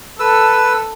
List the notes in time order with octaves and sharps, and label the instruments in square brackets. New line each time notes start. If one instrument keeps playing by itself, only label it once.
[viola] A4 [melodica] B4 E6